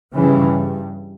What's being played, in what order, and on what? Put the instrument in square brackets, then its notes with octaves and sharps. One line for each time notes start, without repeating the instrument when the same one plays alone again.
[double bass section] G2 C#3 E3